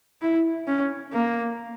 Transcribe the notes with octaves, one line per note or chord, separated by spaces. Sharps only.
E4
C#4
A#3